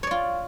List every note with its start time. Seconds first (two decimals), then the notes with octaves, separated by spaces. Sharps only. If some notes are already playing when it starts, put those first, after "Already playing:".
0.03 C#5
0.07 D5
0.11 F4